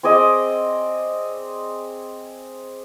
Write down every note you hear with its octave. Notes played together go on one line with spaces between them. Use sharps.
C4 G#4 D5 D#5